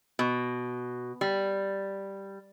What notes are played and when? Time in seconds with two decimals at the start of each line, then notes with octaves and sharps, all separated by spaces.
0.19 B2
1.21 G3